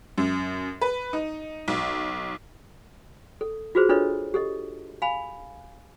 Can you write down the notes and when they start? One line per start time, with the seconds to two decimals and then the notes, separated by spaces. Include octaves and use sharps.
0.18 F#2
0.81 B4
1.13 D#4
1.68 B1
3.41 A4
3.75 F4 F#4 G#4 B4 C5
3.89 D4 F4 A4 B4 C#5 D#5
4.34 G4 A4 D#5
5.02 F5 G#5 B5